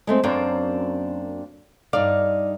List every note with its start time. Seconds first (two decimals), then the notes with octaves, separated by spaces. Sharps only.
0.07 G#3 A3 C4
0.24 F#2 A#3 C4 D4
1.93 G2 D#4 D5 F5